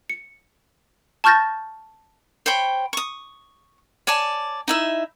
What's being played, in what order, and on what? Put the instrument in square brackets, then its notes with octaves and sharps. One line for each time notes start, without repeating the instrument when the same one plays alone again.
[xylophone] C#7
A5 C#6 F6 G6 A6 A#6
[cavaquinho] C5 C#5 G5 B5
C#6 D#6
C#5 D5 G#5 A5
D#4 E4 E5